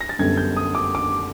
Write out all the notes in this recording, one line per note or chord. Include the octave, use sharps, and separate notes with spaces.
A#6
A6
F#2 D3 G3 B3 G#6
G6
D#6
D6
D6